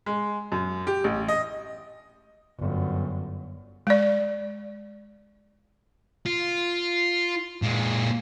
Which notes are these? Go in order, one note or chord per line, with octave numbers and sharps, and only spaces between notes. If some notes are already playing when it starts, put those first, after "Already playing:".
G#3
F#2
G4
A1
D#5
G1 F#2
G#3 D5
F4
A#2 G#3